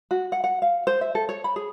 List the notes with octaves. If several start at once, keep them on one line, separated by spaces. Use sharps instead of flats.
F#4
F#5
F#5
F5
C5
E5
A4
C#5
B5
G#4